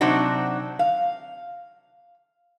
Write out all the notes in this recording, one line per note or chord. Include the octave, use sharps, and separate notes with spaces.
C3 F#3 C4 D4 D#4 F#4
F5